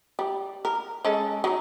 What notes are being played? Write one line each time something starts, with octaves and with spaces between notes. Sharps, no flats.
G3
A#4
G#3 C#4 A4
F#3 D#4